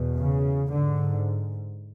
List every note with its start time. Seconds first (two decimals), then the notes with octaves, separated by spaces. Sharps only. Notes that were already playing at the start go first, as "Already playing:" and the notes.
Already playing: E2 B2
0.17 C#3
0.69 G#2 D3